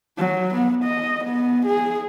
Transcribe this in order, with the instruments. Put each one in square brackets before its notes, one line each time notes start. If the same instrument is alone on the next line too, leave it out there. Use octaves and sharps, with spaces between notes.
[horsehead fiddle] F#3
B3
D#5
B3
G#4